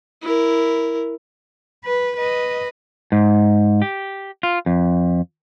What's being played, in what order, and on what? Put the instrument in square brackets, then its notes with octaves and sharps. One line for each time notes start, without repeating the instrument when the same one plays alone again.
[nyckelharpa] E4 A#4
[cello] B4
B4 D#5
[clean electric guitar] G#2
G4
F4
F2